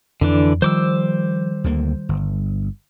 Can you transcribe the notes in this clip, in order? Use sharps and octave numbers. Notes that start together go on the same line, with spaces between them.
F2 D3 E3 D4
D#3 F3 G3 C5 D6 E6
D2 D3 A#3
G1